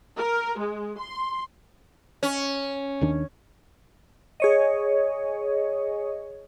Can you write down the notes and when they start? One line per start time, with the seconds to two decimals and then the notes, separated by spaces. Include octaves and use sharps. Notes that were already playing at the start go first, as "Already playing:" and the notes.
0.16 A#4
0.58 G#3
0.98 C6
2.23 C#4
3.01 D#2 D#3 D4
4.40 G#4 C#5 D#5